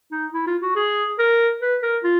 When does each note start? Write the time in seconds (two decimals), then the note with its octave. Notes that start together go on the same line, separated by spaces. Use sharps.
0.12 D#4
0.33 E4
0.47 F4
0.62 F#4
0.76 G#4
1.19 A#4
1.61 B4
1.82 A#4
2.04 F4